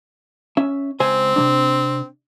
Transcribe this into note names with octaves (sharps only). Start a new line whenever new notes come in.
C#4 E5
C#2 C4 C5 G#5
C3 F#3 D4